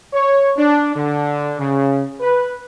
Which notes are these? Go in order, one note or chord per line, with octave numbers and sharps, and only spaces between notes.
C#5
D4
D3
C#3
B4